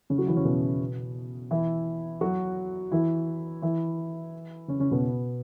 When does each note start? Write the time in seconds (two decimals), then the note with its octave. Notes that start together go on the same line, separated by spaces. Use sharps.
0.10 C#3 C#4
0.18 F#3 F#4
0.27 E3 E4
0.36 C#3 C#4
0.45 B2 B3
1.51 E3 E4
2.21 F#3 F#4
2.92 E3 E4
3.62 E3 E4
4.68 C#3 C#4
4.80 C#3 C#4
4.91 B2 B3